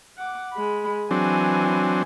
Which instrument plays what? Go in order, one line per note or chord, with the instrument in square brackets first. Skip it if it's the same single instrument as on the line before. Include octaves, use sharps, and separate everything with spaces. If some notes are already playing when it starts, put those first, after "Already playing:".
[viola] F#5 D6
G#3 B5
[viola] E3 G#5 [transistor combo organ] F#3 C4 D4